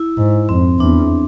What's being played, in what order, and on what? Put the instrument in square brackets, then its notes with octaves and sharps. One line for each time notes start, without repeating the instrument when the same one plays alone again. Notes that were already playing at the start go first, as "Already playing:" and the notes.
Already playing: [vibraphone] E4
[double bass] G#2
[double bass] F2 [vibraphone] C4
[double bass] E2 [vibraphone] D4